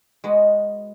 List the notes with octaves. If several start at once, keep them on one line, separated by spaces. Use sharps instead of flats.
G#3 B3 F#4